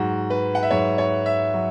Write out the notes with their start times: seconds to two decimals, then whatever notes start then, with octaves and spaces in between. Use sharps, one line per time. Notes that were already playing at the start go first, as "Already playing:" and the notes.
Already playing: G#2 F#3 F#4
0.30 B4
0.55 F#5
0.63 E5
0.70 G#2 F#3 C#5
0.98 C#5
1.26 E5
1.54 F#3